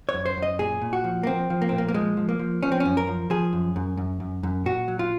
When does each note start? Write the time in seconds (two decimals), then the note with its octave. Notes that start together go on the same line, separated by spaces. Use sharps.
0.09 C#5
0.14 F#2
0.26 C5
0.37 F#2
0.42 D#5
0.59 A#2 G#4
0.82 A#2
0.93 F#4
1.04 F3
1.23 A#3
1.27 F3 C4
1.50 F3
1.62 A#3
1.69 A#2 C4
1.78 A#3
1.88 A#3
1.94 F3 G#3
2.17 F3
2.29 A#3
2.39 F3
2.63 F3 C#4
2.72 C4
2.80 C#4
2.85 F#2
2.97 A#4
3.07 F3
3.30 F3 G#4
3.53 F#2
3.76 F#2
3.98 F#2
4.20 F#2
4.43 F#2
4.66 A#2 F#4
4.88 F#3
4.99 F4